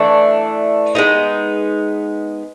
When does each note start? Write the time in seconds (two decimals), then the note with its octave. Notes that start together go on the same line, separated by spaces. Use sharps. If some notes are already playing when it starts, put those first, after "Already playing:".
Already playing: E3 A3 D4
0.95 G#3 B3 D#4